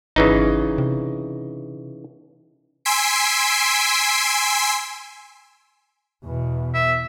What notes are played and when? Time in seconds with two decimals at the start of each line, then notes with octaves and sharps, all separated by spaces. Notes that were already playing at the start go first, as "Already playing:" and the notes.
0.16 G#1 C#3 E3 D#4
0.78 C3
2.85 G#5 C6 E6 B6 C7 D7
6.24 E2 B2
6.74 E5